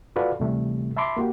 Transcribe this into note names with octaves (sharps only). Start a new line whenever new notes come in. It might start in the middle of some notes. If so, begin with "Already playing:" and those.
F4 F#4 A4 B4 D5 F5
D2 C3 E3 G3 A3
E5 A5 B5 C6 D6
A#3 F#4 G4